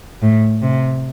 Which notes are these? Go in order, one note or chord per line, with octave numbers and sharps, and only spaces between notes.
A2
C3